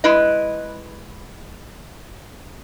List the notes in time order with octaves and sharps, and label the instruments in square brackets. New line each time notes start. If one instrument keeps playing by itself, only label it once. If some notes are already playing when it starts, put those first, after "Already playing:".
[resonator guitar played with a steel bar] G#3 E4 B4 D#5